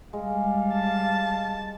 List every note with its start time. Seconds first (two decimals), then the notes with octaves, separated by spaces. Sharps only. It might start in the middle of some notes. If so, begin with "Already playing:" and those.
0.13 G3 G#3 F5
0.73 A5